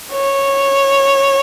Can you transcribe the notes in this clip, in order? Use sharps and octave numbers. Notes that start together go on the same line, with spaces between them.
C#5